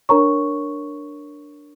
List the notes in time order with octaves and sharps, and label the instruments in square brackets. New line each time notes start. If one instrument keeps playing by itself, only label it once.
[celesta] D4 A#4 C#5 A#5 C#6